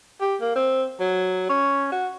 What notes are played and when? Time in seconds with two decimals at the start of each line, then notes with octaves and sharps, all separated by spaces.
0.21 G4
0.41 A#3
0.56 C4
1.00 F#3
1.49 C#4
1.92 F#4